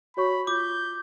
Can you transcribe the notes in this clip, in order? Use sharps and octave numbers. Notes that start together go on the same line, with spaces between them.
F#4 C#5 B5 C#6
F4 D6 G6